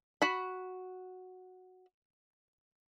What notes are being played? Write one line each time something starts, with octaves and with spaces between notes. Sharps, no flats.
F#4 B5